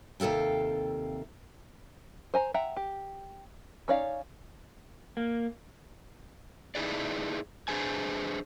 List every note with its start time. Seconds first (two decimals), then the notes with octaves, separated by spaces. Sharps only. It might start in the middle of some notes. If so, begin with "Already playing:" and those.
0.20 D#2 C3 A4 F5 G5
2.34 C5 G#5 A#5
2.54 E5 F#5 G5 A#5
2.77 G4
3.88 C#4 D#4 C#5 D5 F5
5.17 A#3
6.75 D#4 E4 G#4 B4 D5
7.68 D4 G#4 B4 C5 G#5